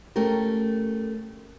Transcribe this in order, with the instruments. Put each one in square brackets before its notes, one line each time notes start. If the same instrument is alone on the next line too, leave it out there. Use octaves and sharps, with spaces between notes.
[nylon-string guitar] A3 C#4 G4 A#4